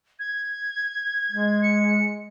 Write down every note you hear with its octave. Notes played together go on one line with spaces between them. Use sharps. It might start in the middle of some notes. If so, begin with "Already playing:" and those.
G#6
G#3
C#7